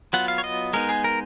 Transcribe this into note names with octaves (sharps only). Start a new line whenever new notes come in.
F#3 B3 F4 F#5
F5
C#5
D#5
G#3 B3 D#4 A#4
G#4
A#4